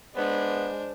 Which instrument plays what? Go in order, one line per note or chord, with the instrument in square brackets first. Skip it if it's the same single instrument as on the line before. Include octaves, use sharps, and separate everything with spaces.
[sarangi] G#3 [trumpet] B3 [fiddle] D4 [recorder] C5